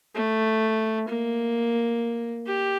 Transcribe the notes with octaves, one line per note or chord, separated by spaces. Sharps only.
A3
A#3
G4